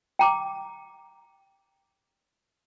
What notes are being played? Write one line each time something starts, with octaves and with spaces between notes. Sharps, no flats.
G5 A#5 D6